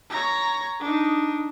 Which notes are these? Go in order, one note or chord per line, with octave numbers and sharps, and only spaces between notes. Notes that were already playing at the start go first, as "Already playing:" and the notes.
C#5 A#5
D4 D#4